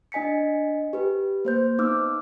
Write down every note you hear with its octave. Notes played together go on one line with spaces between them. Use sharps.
D4 D#5 G#5 B6 C#7
G4 B4
A#3 C5 G6
B3 D#4 D6 E6 F6